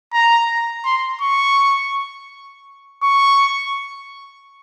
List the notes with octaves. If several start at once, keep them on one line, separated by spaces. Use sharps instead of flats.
A#5
C6
C#6
C#6